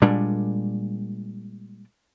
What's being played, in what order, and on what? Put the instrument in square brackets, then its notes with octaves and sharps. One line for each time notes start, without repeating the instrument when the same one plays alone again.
[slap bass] A#2 G3 G#3 D4